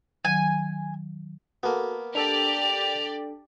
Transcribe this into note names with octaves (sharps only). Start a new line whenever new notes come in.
D#3 F#3 G#5
A#3 B3 F#4 A4
D4 G4 A4 D5 F7